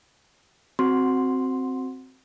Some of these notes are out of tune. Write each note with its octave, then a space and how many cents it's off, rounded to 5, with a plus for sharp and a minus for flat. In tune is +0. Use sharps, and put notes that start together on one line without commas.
C4 +0 F#4 +0 C6 +0